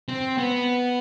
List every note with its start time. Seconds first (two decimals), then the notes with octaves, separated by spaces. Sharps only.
0.08 C4
0.38 B3